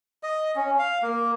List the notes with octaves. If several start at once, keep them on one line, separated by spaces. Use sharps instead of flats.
D#5
C#4
F5
A#3